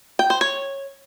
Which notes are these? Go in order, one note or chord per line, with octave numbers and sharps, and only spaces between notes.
G5
C5
C#5